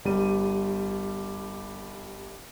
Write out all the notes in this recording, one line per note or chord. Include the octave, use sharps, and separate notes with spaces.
G1 G3 D#7